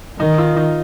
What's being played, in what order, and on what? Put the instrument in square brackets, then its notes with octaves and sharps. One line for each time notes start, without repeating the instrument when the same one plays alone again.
[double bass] D#3 [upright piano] D#4
[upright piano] F4
D#4